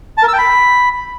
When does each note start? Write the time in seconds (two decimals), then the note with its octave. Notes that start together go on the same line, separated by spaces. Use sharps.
0.18 A5
0.23 A#4
0.28 E6
0.33 G5
0.38 B5